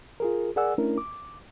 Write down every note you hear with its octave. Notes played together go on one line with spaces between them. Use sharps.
F4 G#4 A#4
G#4 A#4 D5 F#5 G#5 E6
A3 C#4 D4 E4 A#4
D6